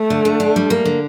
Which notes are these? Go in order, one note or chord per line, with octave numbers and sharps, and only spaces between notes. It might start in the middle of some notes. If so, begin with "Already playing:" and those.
Already playing: A3
D3
D3
D4
G3
A#3
D3